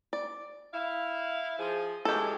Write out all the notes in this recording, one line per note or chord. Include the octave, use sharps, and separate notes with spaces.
D5
E4 F5
F3 G#4
F#2 E3 G#3 G4 A4